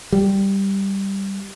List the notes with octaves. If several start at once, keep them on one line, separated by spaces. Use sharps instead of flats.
G3